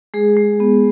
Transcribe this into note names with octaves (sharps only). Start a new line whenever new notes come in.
G#3 G#4
G#3
B3